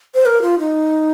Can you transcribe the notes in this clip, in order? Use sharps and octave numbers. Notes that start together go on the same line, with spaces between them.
C5
A#4
F4
D#4